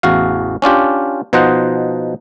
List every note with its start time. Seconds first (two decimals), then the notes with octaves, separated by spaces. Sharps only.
0.03 A1 E2 F#4 F5
0.62 C#4 D4 F4 G4
1.33 B2 F3 D#4 C5 D#5 F#5